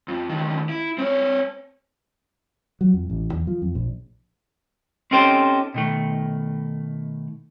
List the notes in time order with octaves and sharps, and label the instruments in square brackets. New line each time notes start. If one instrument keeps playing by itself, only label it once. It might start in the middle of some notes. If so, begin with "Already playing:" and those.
[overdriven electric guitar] F2
D2 D#3
E4
C4 C#5
[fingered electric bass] F#3
F2
A1
E2
F3
F2
A#1
[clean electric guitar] C4 C#4 D#4 G4 A4 C5
B2 D#3 A3